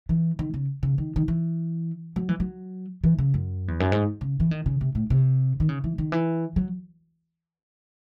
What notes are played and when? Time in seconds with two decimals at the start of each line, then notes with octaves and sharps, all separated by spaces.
0.09 E3
0.39 D#3
0.54 C#3
0.83 C#3
0.98 D#3
1.16 D#3
1.28 E3
2.16 F#3
2.29 E3
2.40 F#3
3.04 E3
3.18 C#3
3.34 F#2
3.68 E2
3.80 F#2
3.92 G#2
4.21 C#3
4.40 E3
4.51 D#3
4.66 C#3
4.81 C3
4.95 A2
5.10 C3
5.60 D#3
5.69 C#3
5.84 E3
5.98 D#3
6.12 E3
6.56 F#3